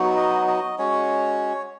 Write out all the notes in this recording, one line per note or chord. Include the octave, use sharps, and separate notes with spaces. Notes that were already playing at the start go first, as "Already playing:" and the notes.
Already playing: F#3 B3 D#4 F#4
D#5
D#5
G#3 C#4 F#4 C#5